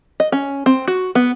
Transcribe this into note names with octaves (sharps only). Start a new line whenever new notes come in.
D#5
C#4
C4
F#4
B3